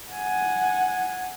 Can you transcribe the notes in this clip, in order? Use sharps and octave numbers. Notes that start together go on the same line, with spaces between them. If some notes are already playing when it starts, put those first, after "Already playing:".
F#5 G#5